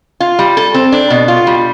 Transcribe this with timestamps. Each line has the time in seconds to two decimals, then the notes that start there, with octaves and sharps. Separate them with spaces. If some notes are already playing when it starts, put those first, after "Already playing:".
0.20 F4
0.39 G3
0.57 A4
0.74 C4
0.92 D4
1.10 B2
1.28 F4
1.47 G3